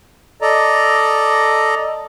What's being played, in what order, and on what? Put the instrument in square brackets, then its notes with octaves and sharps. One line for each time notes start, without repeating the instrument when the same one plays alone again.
[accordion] A4 D5 D#5 A#5